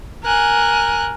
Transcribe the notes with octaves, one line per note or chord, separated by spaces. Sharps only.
A#4 G#5 F#6